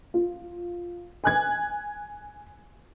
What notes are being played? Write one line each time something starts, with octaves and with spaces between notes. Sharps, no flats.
F4
G#5 F#6 G#6